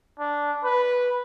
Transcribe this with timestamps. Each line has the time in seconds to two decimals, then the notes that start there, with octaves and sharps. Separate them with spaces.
0.19 D4
0.64 B4